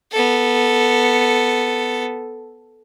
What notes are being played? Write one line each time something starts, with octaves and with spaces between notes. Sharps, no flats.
B3 A4